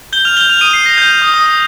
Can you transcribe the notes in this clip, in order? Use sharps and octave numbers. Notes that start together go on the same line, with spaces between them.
G6 G7
F6 F7
G6 G7
F6 F7
D#6 D#7
C7
A#6
G6
D#6
D#6
D#6